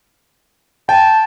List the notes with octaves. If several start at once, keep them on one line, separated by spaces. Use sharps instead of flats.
G5 A5